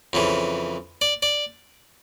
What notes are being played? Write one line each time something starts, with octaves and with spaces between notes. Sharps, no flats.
F2 C#3 E3
D5
D5